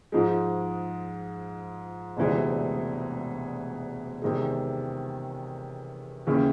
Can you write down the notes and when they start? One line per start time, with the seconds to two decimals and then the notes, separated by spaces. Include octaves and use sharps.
0.12 G#2 F3 G#3
2.17 E1 D2 C3 E3 G#3
4.22 E2 C3 D#3 G#3
6.27 D#2 C#3 E3